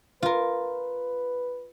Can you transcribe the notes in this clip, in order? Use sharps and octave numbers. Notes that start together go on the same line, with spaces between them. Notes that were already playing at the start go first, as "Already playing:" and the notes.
F4 A#4 B4